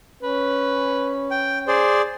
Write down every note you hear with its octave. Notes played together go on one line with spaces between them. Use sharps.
C#4 B4
G5
G#4 C5 D5